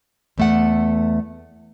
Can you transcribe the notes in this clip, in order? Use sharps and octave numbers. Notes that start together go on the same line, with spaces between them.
E2 A3 F#5